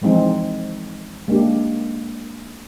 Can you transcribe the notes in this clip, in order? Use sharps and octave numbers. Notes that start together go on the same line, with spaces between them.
E3 F3 G#3 C4 D#4
G#3 A#3 D4 G4